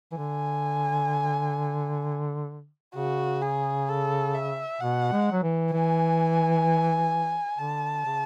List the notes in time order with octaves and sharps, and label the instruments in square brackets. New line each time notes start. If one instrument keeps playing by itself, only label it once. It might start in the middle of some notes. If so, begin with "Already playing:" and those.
[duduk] E3
[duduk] D3 [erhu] G#5
[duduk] C#3 [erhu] F#4
[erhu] G#4
A4
E5
[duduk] B2 [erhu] F#5
[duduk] G#3
F#3
E3
[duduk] E3 [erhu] G#5
[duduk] D3 [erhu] A5
[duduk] C#3